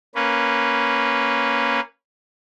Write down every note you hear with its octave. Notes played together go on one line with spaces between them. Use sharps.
A#3 C#4 B4